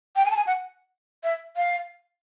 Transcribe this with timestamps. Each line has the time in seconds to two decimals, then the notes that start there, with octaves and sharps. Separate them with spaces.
0.16 G5
0.26 G#5
0.31 A5
0.37 G#5
0.47 F#5
1.24 E5
1.56 F5